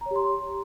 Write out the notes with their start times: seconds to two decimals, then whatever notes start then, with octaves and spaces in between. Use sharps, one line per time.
0.01 A#5
0.06 C#5
0.11 G4
0.16 C6